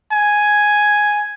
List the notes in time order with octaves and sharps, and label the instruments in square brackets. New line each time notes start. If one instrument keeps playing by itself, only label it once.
[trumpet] G#5